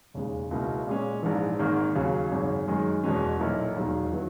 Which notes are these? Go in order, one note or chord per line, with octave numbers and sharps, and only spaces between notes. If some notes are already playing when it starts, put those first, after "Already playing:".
E1 D#2 C#3 G#3
C#2 B2 A#3 E4
A#2 G#3 C#4
A#1 G#2 E3
G#1 G#2 D#3 A#3
D#2 C#3 F#3
G#1 F#2 C#3
F#2 D#3 G#3
E2 B2 G#3 C#4
B1 A#2 A#3 E4
E1 D#2 D#3 F#3
D#3 F#3 B3 E4